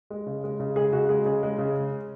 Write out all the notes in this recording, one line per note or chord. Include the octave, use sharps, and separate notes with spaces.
G#3
C#3
G#3
C#3
G#3 G#4
C#3 F#4
G#3 G#4
C#3 G#4
G#3
C#3